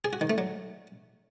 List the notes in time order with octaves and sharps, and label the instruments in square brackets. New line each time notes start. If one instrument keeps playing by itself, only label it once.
[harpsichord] G#4
F#4
D#3
A3
F#3